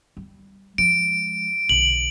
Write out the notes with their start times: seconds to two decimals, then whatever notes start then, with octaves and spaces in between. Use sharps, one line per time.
0.17 G3
0.78 F3 G#3 D7
1.69 B1 D3 F#7